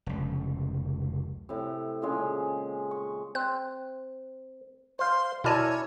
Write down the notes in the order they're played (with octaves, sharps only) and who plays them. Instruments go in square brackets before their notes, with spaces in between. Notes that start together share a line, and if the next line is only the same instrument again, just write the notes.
[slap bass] F1 C#2
[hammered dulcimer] A2 C3
A#2 C#3 F3 G#3
C#6
[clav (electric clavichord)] C4 [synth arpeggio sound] F#6
[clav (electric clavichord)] C5 F5 [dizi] C6
[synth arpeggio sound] B2 G#5 A5 [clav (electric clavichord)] E4 A#4 D5 [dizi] C#5